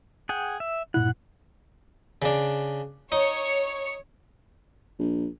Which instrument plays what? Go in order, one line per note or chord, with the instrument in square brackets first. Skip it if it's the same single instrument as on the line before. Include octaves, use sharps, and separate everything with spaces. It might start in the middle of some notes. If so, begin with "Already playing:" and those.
[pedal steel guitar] G#4 F#5 G5
E5
[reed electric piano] G2 A#2 E4 [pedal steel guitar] F#5
[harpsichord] C#3 D4
[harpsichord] D#4 [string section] C#5 C#7
[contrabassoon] A#1